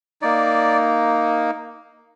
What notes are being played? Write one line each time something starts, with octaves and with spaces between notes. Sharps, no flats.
A#3 D#4 D5